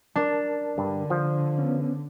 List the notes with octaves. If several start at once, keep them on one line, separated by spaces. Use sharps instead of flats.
D4 A#4 A5
G2 D3
F3
B3 C#4